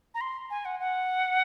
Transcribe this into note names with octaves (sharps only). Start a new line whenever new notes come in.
A#5
C6
G#5
F#5
F#5